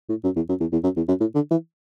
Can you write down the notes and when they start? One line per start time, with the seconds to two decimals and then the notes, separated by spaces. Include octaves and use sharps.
0.09 A2
0.24 F#2
0.36 E2
0.49 F#2
0.61 E2
0.73 E2
0.84 F#2
0.97 E2
1.08 F#2
1.20 A2
1.35 D3
1.51 E3